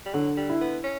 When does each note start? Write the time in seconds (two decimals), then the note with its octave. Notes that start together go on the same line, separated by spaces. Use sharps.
0.06 G3
0.14 D3 F#3
0.37 G3
0.49 E4
0.61 B3
0.84 C#4